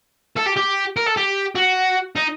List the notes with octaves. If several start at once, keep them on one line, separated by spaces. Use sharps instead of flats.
A4
G4
G4
A#4
A4
G4
F#4
D#4